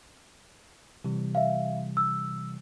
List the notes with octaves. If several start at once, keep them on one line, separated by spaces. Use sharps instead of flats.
C3 E3 G3
E5 F5
E6